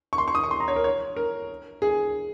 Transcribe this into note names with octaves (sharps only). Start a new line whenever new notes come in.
C#6
C6
C#6
D#6
C#6
C6
A#5
C#5
A#4
C#5
A#4
G#4